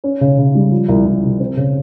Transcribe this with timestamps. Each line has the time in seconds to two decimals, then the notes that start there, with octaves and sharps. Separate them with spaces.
0.04 C#4
0.21 C#3
0.38 C#3
0.55 G3
0.72 F3
0.89 C2
1.06 C2
1.23 C3
1.40 C4
1.57 C#3